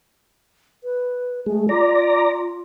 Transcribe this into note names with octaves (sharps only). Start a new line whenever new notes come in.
B4
G#3 A3
F4 D5 A#5